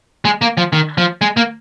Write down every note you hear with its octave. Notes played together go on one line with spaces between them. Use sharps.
G#3
A#3
F3
D#3
F3
G#3
A#3